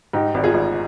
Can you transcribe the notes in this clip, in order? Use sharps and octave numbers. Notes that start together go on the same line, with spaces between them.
G#2 D#4 G4
G#1
F4 G#4
G#1